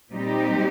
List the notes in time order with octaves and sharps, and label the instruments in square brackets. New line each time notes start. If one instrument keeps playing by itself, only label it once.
[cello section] A#2 G3 C4 D#4 G4